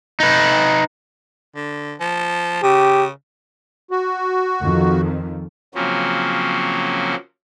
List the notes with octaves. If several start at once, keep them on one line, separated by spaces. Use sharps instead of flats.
D#4 B4
D3
F3
C#3 G4
F#4
F2 D#3 F3
C#3 F3 F#3 A#3 C4 C#4